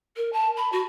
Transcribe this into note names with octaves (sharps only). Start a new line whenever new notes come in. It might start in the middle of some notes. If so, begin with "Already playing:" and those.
A#4
A5
B5
F#4